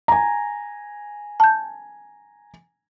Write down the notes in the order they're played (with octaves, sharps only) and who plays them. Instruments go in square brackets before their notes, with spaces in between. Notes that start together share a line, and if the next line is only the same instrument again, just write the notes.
[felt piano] G#5 A#5
[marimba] A5 G6